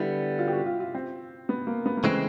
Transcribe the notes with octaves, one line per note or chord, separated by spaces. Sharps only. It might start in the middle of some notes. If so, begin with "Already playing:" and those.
Already playing: D3 G3 B3 E4
F4
G4
F#4
F4
F4
C4
B3
A#3
B3
A#3
C#3 E3 G#3 A3 C4